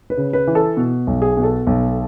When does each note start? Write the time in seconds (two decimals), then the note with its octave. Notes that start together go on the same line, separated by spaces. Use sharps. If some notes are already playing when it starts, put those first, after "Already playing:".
0.10 B4
0.17 C#3
0.33 B4
0.47 E3
0.55 A4
0.77 B2
1.07 B1
1.22 G#4
1.37 B2
1.43 A4
1.67 B1